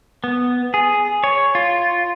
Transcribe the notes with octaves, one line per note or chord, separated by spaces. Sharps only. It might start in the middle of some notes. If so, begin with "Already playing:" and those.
B3
G#4
C#5
F4